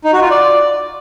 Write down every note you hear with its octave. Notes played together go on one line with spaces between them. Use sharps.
D#4
F#4
F4
D5